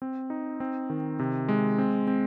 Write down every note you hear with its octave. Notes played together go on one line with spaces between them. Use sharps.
C4
D#4
C4
D#3
C3
G#3
C4
C4